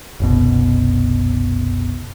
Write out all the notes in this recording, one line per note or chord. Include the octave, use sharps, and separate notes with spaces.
F#1 C2 B2